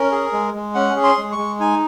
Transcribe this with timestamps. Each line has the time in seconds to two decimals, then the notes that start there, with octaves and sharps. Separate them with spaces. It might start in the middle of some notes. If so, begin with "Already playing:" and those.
Already playing: C#4 A#4
0.12 G#4
0.33 G#3
0.54 G#3
0.75 C#4 F#5
0.96 G#4
1.03 C6
1.18 G#3
1.32 C#6
1.38 G#3
1.60 D#4 G#5